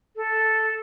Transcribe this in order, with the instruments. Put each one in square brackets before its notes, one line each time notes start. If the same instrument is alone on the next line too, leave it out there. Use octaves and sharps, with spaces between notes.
[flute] A4